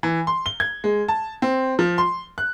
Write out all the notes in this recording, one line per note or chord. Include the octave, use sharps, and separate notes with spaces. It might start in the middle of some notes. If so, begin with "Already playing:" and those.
E3
C6
G7
G#6
G#3
A5
C4
F3
C6
F#6